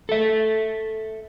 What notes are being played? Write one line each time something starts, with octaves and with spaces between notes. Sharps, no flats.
A4 E5